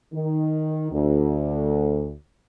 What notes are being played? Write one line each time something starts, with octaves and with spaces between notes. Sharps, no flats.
D#3
D2